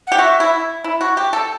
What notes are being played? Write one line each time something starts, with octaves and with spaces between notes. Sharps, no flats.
G4 F#5
F#4 E5
E4
E4
F#4
G4
A4